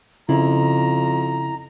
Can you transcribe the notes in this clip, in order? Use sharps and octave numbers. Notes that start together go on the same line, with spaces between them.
F2 C#3 E4 A#5